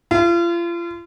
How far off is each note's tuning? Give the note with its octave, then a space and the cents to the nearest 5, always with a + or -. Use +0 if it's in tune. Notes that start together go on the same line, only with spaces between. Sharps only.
F4 -35